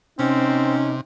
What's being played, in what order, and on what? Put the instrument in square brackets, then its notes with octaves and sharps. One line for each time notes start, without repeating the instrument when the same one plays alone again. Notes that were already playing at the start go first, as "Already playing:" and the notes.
[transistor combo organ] C3 [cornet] C4 [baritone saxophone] C#4 [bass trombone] D#4